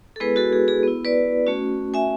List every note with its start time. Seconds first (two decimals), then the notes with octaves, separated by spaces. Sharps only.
0.16 A4
0.20 G#3 B3 E4 G#4 B4
0.36 F#4 A4
0.53 G#4
0.68 G#4
0.83 B3 E4
1.05 B4 D5
1.47 A3 C#4 F#4
1.94 E5 G#5